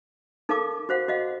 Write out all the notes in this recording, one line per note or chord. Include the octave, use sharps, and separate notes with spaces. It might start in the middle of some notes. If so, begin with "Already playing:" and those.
D#4 A4 A#4 F5 A5 D6
F#4 C5 F5 F#5
F#4 D#5 F5 F#5